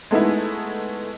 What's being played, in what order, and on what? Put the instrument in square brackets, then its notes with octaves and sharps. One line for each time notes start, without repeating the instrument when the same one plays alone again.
[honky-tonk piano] G#3 A3 B3 D#4 E4